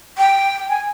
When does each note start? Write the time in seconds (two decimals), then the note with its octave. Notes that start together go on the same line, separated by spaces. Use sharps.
0.17 G5
0.68 G#5